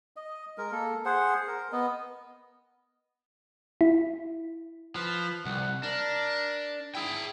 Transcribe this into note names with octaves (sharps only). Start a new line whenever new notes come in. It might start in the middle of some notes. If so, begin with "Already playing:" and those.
D#5
G#3 A#4
A#3 A4
G#4 C5 F#5
A#4
B3 D#5
E4
F3 B4
C2 F#5
D4 A#4
E4 G#4 G5